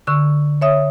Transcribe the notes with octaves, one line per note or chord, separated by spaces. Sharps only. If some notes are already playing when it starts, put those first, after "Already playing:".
D3 C#6 E6
C#5 E5 D#6